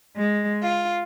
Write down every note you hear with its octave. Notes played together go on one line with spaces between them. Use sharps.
G#3
F4